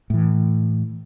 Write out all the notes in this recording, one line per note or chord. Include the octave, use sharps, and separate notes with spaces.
A2 E3